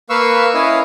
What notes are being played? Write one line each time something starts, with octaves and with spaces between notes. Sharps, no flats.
A#3 B4 F5 C#6 E6
C#4 E4 C#5 D#5 F5